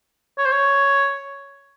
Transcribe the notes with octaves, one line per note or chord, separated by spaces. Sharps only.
C#5
C5
C#5